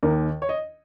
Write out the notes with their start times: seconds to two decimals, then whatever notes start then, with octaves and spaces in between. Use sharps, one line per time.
0.03 D#2 D#3 A#4
0.42 C#5
0.49 D#5